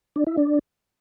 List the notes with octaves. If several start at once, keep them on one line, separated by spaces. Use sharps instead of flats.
D4
E4
D4